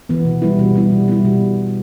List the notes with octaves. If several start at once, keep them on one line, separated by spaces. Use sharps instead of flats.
E3 B3
B2
G3 B3 E4
B2
G3 B3 E4
B2
G3 B3 E4
B2